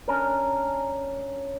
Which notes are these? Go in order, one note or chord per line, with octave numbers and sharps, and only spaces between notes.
C#4 D4 A#4